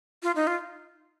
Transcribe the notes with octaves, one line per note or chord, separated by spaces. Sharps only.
F4
D#4
F4